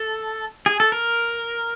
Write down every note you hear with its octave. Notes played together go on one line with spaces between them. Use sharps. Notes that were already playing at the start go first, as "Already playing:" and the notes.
Already playing: A4
G#4
A4
A#4